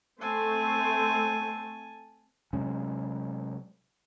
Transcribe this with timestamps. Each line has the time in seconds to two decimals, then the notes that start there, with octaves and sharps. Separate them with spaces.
0.21 A3 C4 G#5 A5
2.53 C3 F#3 G#3 C#4